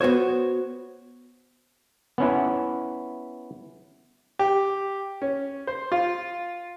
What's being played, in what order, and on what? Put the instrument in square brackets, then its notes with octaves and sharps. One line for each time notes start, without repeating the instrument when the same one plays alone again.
[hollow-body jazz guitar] B3 F#4 C5 C#5
[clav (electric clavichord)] B3 C#4 E4
[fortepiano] G4
C#4
C5
F4